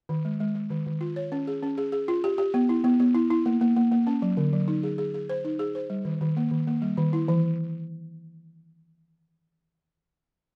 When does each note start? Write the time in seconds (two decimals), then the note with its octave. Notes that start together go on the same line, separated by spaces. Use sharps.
0.09 D#3
0.25 G#3
0.40 G#3
0.55 G#3
0.71 D#3
0.86 D#3
1.01 F4
1.16 C#5
1.32 C#4
1.47 G#4
1.63 C#4
1.78 G#4
1.92 G#4
2.08 F4
2.24 G4
2.38 G4
2.54 B3
2.69 E4
2.84 B3
3.00 B3
3.15 E4
3.30 E4
3.46 A#3
3.61 A#3
3.76 A#3
3.92 A#3
4.07 C#4
4.22 F#3
4.37 D3
4.53 F#3
4.68 D#4
4.83 G#4
4.98 G#4
5.14 G#4
5.29 C5
5.45 D#4
5.59 G#4
5.75 C5
5.90 G3
6.05 D#3
6.21 D#3
6.37 A#3
6.51 D#3
6.67 A#3
6.82 G3
6.97 D#3
7.13 E4
7.28 E3